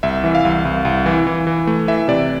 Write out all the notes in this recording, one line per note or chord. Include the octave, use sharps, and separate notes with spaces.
C2 E5
E3
F5
C2
C2
C2
E3
E3
E3
A3
E3 E5
C3 D5